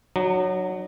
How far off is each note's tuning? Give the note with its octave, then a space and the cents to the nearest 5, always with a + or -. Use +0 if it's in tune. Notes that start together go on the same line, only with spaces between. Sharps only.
F#3 +0 D#4 -40